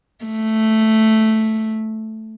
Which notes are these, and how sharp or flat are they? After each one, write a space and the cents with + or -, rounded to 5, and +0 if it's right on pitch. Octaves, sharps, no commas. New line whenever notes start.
A3 +0